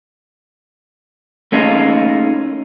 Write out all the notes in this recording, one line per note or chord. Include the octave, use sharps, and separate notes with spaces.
A3 A#3 C#4 D#4 F4 G#4